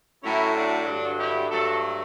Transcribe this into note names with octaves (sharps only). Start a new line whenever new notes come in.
A2 F#3 A3 C#4 E4
D4 F#4
G2 D3 F#3
E4 G4
G2 F#3 A3 F#4 A4